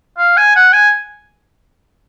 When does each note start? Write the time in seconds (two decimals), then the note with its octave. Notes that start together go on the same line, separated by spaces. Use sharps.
0.18 F5
0.37 G#5
0.55 F#5
0.73 G#5